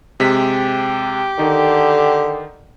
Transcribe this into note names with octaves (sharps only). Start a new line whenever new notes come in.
C3 G#3 G4 B6
D3 D#3 D#4